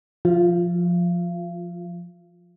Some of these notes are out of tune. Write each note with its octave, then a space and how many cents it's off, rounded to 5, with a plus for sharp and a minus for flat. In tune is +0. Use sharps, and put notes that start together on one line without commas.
F3 +0 F4 +25 F5 -35